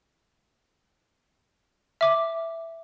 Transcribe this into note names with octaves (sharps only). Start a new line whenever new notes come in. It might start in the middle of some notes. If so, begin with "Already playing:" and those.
E5 D6